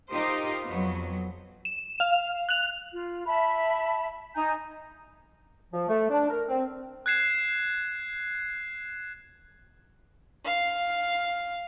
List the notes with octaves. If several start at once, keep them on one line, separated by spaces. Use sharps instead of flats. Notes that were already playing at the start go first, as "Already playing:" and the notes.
D#4 F4 G4 A#4 C5 D#5
F2 F#3 B3
E7
F5
F#6 F7
F4
E5 A5 B5
D#4 G#5 A#5 G6
F3
A3
D4
A#4
C4
F#6 G#6 C7 E7
F5